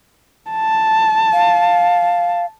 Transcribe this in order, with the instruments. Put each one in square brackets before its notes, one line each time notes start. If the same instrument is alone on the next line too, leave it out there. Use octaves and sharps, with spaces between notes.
[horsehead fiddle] A5
[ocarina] F5